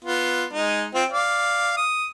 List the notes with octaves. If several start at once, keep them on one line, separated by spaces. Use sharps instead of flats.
B3 F4
G#3 D#4
C4 F4 G5
D5 F5
D#6